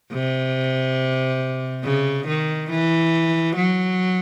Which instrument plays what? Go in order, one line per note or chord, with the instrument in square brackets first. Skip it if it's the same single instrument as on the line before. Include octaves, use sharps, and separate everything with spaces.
[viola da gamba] C3
C#3
D#3
E3
F#3